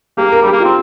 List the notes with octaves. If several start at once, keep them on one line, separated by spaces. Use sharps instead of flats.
A#3 G4
A#4
G3 G4
A#3
C4 F4